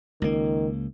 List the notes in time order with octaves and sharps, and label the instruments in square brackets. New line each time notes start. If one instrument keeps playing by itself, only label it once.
[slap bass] C#2 A#3 [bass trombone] D#3